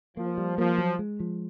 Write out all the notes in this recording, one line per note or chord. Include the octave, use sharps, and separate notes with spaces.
F3 A#3
G3
F3 A#3
F#3
G#3
F3